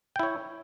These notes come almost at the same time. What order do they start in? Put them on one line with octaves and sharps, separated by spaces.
G5 E4 C#5